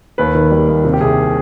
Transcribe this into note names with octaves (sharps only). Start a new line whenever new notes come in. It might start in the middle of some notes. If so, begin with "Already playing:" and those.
D#2 B4
D#3
G3
D#2
C3
G4
C2 G#4